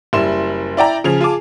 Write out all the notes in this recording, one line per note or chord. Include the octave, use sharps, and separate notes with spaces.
F#1 G3 E4 C6 E7
E4 D5 G5 A#5
C#3 F3 G#4 F7
F4 G#4 G#5 A5 D6